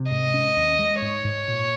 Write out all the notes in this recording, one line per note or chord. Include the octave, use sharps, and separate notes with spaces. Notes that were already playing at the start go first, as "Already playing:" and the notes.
Already playing: C3
G#2 D#5
C#4
D#2
G#3
G#2 C#5
G#2
A#2